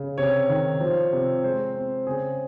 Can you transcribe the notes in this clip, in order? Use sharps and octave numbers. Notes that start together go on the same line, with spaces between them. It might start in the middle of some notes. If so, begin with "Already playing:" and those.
Already playing: C#3
C3 C#5
D#3
F3
C3
G#3 C5
C4
C#3 G#4